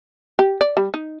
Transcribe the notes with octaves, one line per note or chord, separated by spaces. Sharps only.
G4
D5
G3
D#4